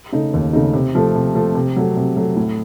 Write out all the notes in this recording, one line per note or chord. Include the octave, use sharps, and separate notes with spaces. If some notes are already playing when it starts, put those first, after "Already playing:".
C#3 A3 D#4
D#2
C#3 A3 D#4
C3
F3 A3
C3
F3 A3
C3
F#3 A3
C3
F#3 A3
A2